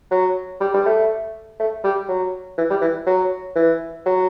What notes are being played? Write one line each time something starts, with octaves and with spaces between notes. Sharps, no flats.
F#3
G3
G3
A3
A3
G3
F#3
E3
G3
E3
F#3
E3
F#3